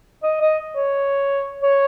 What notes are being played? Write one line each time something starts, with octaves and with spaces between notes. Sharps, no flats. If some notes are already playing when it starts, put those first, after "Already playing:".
D#5
D#5
C#5
C#5